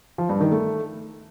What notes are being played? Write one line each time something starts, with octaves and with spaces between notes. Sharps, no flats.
F3
G2
D#3
A3